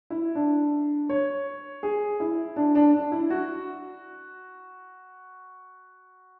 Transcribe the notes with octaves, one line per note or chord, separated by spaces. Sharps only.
E4
D4
C#5
G#4
E4
D4
D4
D4
E4
F#4